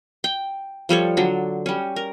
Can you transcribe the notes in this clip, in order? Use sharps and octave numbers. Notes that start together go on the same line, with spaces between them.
G5
F3 G3 A4 C#5
D3 F#3 D4
G3 C#4
A#4